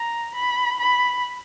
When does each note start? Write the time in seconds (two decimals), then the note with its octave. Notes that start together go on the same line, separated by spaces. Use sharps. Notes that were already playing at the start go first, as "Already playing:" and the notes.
Already playing: A#5
0.34 B5
0.80 B5